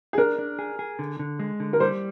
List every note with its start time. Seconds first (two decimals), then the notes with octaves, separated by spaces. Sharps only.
0.13 G#4
0.18 D4 A#4
0.39 D4
0.59 G#4
0.79 G#4
0.99 D3
1.19 D3
1.39 G#3
1.60 D3
1.73 A#4
1.80 G3 C5